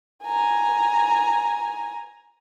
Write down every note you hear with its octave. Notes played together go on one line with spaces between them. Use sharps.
G#5 A#5